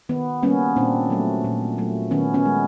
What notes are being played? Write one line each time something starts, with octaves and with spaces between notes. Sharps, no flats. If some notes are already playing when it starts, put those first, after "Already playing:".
D#3 B3
G3 A#3 B3 C#4
A#2 C4 D4
F#3 A3
A#2
F#3 A3
D#3 B3 C#4
B3 C#4
G#3